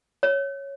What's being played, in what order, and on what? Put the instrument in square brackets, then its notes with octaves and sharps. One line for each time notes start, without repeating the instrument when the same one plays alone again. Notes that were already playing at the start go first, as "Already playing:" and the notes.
[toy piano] C#5